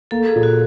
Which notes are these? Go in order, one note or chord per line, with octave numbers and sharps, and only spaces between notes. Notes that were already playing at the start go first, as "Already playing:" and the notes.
A#3 A4
G#4
A#2
F#4